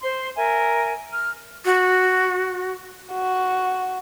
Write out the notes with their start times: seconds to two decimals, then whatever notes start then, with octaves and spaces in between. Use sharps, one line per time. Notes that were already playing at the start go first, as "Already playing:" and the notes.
0.02 C5 C6
0.36 A#4 E5 G#5
1.12 F6
1.65 F#4
3.13 F#4